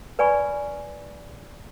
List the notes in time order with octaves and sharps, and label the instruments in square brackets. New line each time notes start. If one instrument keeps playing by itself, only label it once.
[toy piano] B4 D5 G#5 B5 C#6